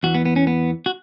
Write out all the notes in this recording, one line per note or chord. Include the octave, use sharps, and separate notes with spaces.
E2 E3 F#4
B3
B3
C#4
B3
F#4